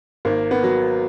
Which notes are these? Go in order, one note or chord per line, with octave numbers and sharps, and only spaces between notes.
G#1 A#3
B3
F#3